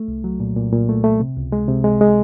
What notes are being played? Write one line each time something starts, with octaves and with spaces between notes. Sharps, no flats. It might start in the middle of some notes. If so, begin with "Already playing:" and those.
Already playing: A3
C2
F#3
A#2
A#2
A#2
A3
A3
C3
C#2
G#3
C3
G#3
G#3